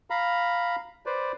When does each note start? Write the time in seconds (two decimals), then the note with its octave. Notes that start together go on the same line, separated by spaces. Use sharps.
0.10 F5 A#5 B5
1.06 B4 C5 D5